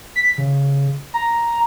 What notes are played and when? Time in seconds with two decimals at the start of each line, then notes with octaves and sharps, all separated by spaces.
0.16 B6
0.38 C#3
1.14 A#5